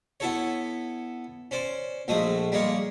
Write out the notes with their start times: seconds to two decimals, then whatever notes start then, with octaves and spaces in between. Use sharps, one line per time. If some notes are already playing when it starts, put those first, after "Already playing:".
0.20 B3 E4 A4 C#5
1.51 C#4 C5 D5
2.08 A#1 G#3 A3 D#6
2.52 G3 G#3 A#3 C#5